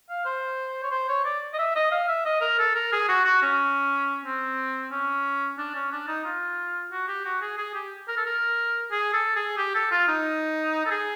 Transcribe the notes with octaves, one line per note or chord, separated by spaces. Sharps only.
F5
C5
C#5
C5
C#5
D5
D#5
E5
D#5
F5
E5
D#5
A#4
A4
A#4
G#4
F#4
F#4
C#4
C4
C#4
D4
C#4
D4
D#4
F4
F#4
G4
F#4
G#4
G#4
G4
A#4
A4
A#4
G#4
A4
G#4
G4
A4
F4
D#4
A4
G#4